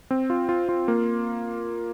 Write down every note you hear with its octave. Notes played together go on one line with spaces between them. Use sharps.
C4
F4
F4
F4
A#3